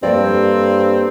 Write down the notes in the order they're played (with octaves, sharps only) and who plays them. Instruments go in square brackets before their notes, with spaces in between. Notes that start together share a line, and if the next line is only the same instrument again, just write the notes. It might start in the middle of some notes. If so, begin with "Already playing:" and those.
[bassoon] G2 [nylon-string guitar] A#3 A4 D5 [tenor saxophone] C4